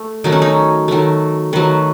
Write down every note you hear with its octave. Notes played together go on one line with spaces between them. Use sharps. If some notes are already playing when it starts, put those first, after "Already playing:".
Already playing: A3
D#3 F#3 A3 D#4
C#4
D#4
D#3 F#3 A3
D#3 F#3 A3 B4